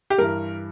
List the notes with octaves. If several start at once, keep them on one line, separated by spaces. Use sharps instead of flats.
G4
G2 E3 A#4